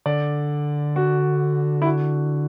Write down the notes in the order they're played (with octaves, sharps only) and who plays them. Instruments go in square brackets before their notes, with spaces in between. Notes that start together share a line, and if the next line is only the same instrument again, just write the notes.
[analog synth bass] D3 [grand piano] D5
[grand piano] F#4
E4
F#4